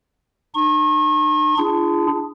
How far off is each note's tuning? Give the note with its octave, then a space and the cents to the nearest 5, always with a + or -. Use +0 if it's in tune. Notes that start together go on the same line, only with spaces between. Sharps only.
D#4 -45 C#6 -40
D4 +0 F4 -40 G#4 +0